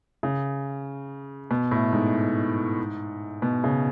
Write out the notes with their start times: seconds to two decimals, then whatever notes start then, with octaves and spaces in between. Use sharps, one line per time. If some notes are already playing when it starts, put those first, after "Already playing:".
0.23 C#3
1.51 B2
1.71 A2
1.93 G#2
3.42 B2
3.64 C#3